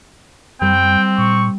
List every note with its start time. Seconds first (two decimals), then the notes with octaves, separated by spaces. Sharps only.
0.61 F#2 G3 C4 G5
1.18 A#2 C#6